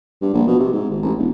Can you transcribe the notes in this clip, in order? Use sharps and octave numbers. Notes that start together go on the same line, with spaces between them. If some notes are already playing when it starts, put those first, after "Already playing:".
G2
A#1
B2
C3
G#2
G#1
A1
E1